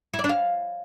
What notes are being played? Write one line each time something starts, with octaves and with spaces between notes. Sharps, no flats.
E4
D5
D4
F5